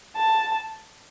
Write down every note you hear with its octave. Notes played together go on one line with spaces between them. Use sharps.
A5